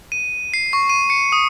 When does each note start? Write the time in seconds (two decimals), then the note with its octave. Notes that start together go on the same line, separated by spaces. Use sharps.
0.12 D#7
0.54 C7
0.73 C#6
0.90 D#7
1.10 C#7
1.32 D#6